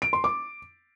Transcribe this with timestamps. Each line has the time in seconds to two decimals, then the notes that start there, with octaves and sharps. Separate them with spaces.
0.02 D7
0.13 C6
0.24 D6